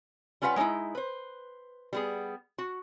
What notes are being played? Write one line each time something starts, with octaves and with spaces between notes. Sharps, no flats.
G3 C#4 F4 B4 E5 F#5
G#3 A#3 C#4 D#4 E4
B4 C5
G3 B3 G#4
F#4